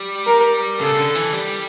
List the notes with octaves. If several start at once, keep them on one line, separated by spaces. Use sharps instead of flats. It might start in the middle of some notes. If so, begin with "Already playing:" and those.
Already playing: G3
A#4
C#3 A4
C#3
D3
E3
G3